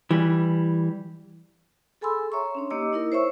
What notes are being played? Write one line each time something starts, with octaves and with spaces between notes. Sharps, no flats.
E3 G3
G#4 A4 G#5 B5 C6 E6
C#5 E5 A#5 C6 C#6
C#4 D4 C#5
A#3 D#4 G4 D#5 D6 E6
D#4 E4 A#4
C5 C#5 E5 C#6 E6